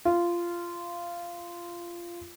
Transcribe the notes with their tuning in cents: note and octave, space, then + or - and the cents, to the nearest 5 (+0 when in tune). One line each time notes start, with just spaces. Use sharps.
F4 -15